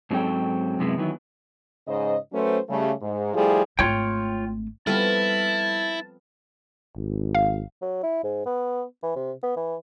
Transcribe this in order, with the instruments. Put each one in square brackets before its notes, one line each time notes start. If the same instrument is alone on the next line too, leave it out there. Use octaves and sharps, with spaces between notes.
[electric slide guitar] G#2 F#3 C4 C#4 A4 G5
F#2 C3 G#3 B3 E4
D#3 E3 F#3 B3 E4
[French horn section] G#2 C#3 C5 D#5
F#3 A3 C#4 B4 C5
C#3 G3 A3
G#2
F3 G3 A3 E4 G#4
[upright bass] G#1 A3 [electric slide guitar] F4 C#5 G5
[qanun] F3 B3 C4 [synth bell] G3 A4 F6 [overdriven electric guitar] E4 [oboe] A5
[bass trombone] G#1
[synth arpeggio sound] F5
[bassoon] F#3
E4
G#2
B3
E3
C3
B3
E3